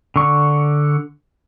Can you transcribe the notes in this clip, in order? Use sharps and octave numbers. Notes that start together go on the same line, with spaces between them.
D3 C#6